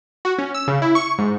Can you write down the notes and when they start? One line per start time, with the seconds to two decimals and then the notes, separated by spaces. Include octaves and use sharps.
0.25 F#4
0.38 C#4
0.54 E6
0.68 C#3
0.82 E4
0.95 C#6
1.19 G#2